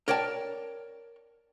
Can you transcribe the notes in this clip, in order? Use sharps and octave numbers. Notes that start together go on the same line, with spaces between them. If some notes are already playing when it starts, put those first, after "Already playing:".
A#4 C#5 D5 G5 A5